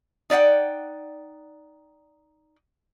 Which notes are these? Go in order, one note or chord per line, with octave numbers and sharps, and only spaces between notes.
D#4 D5 E5 F#5 G5